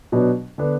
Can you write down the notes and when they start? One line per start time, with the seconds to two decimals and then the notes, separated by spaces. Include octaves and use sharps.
0.12 B2 F#3 B3 D4
0.58 D3 B3 D4